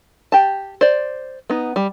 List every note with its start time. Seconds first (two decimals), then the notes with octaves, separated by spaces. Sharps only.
0.32 G4 A5
0.81 C5 D5
1.50 B3 D#4
1.76 G3